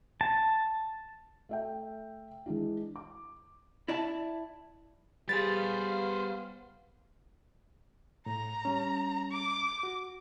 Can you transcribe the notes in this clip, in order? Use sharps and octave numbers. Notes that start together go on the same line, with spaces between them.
A5
A3 E5 G5
E3 G#3 D4 E4
D6
E4 D5 E5 A5
G3 B3 G4 G#4 B4 C5 F5 A6
A2 A#5
G3 C#4
D6
F#4